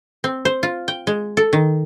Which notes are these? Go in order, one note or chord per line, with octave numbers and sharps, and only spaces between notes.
C4
C5
F4
G5
G#3
A4
D#3